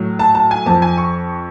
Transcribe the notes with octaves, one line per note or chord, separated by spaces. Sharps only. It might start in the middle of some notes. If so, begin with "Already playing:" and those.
Already playing: A2 F#3
A5
A5
G#5
F2 F3 A5
G#5
C#6